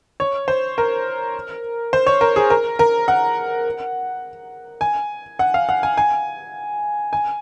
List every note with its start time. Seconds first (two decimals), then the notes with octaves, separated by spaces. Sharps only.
0.20 C#5
0.48 C5
0.78 A#4
1.93 C5
2.07 C#5
2.21 A#4
2.36 G#4
2.50 A#4
2.79 A#4
3.08 F#5
4.81 G#5
5.39 F#5
5.54 F5
5.69 F#5
5.83 G#5
5.98 G#5
7.13 G#5